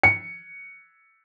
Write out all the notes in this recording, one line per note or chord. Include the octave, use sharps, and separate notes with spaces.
C#7